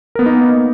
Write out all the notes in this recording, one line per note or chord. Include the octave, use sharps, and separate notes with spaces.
A#3 B3 D#4 A#4